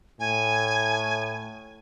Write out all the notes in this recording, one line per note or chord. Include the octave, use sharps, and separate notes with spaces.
A2 G#5